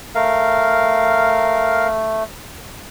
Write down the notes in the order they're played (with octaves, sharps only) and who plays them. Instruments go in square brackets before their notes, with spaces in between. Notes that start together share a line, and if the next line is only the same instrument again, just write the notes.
[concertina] A3 [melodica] A#4 F5